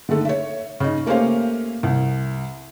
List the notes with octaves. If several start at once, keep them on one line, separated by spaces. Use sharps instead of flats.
D3 D#3 A3 A4
C#5 E5
C#3 D#4
A3 A#3 C#4 G4 C5 F5
C2